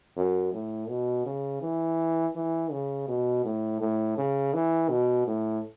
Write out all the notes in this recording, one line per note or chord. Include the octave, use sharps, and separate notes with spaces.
F#2
A2
B2
C#3
E3
E3
C#3
B2
A2
A2
C#3
E3
B2
A2